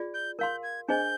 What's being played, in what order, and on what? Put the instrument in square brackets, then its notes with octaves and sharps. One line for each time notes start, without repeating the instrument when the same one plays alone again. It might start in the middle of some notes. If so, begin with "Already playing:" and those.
Already playing: [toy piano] F4 G#4 D5
[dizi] G6
[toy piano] A#4 F5 C6 [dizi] G6
[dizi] G#6
[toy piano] D4 G#4 C5 D#5 G#5 [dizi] G6